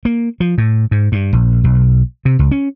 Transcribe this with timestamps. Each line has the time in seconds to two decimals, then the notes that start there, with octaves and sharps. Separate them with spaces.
0.05 A#3
0.40 F3
0.58 A2
0.91 G#2
1.12 G2
1.33 A#1
1.64 B1
2.25 C3
2.39 C#2
2.51 C#4